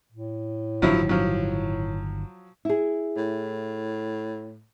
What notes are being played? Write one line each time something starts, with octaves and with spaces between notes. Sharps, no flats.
A2
G1 D#3 F3 F#3 E4
F3 F#3
E4 G#4
A2